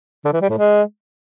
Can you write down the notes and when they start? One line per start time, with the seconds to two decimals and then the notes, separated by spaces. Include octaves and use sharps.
0.25 D3
0.33 E3
0.41 G3
0.50 A2
0.58 G#3